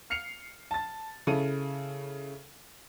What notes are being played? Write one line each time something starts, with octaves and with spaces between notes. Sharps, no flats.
F6 C7 C#7 F7
A5 A6
C#3 E4 A4 D#7